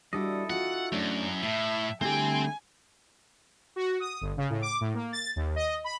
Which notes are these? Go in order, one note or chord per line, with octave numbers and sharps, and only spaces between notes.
G3 D4 E4 F#4 A4 D#5
F4 F#4 F#5
F#2 A3 C#4 D4
A2 E5 A5
D3 G3 A3 C4 E4 G4 G5 G#5
F#4
D#6
G1
C#3
A2
D6
A2
A#3
A6
D#2
D#5
B5